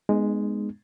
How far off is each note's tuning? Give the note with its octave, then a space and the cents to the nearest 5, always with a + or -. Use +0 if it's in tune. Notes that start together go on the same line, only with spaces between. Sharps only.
G#3 +0 B3 -5 D#4 -40